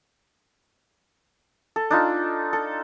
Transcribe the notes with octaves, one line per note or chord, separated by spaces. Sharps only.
A4
D4 D#4 F4
A4